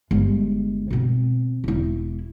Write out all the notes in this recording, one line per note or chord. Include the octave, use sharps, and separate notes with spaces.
G1 G#3
B2 C4
E1 E4